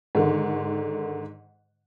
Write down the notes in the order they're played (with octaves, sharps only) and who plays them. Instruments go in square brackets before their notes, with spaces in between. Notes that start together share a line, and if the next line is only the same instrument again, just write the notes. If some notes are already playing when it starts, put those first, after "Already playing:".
[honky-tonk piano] G#2 D3 D#3